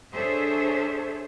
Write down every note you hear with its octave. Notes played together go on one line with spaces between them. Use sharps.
D4 G#4 A4 C5 C#5 E5